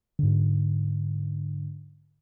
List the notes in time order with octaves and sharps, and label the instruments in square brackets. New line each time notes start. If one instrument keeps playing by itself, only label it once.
[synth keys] G#2 D3